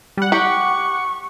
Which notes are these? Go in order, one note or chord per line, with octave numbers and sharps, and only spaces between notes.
G3 F#5
G4 F#5 C#6